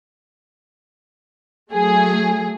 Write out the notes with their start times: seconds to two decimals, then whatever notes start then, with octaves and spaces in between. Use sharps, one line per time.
1.72 F#3 A3 G#4